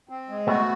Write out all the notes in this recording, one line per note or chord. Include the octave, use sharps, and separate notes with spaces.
C4
G#3
A3 B3 F#4